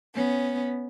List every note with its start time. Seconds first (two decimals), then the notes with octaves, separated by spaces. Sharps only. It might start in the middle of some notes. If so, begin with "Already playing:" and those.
0.15 B3 C#4